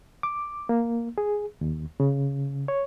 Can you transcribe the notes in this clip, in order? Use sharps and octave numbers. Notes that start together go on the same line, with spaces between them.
D6
A#3
G#4
D#2
C#3
C#5